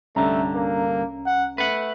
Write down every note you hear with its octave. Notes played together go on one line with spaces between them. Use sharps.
C2 G2 D3 A3 C#4 A#5
A#3
F#5
A3 B4 F#5